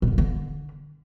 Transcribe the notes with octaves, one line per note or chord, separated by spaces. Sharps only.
B2
D3
B3
D3